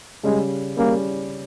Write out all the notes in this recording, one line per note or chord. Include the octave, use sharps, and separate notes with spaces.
C#3 G3 G#3 C#4
C#3 G3 A#3 C#4